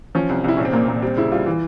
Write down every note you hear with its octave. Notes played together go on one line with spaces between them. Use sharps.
F3 C#4
C2
C2 E4
A#1 C#4
C4
A#2 A#3
A#2 C4
G3 C4
C#3 E4
G3 F4
E3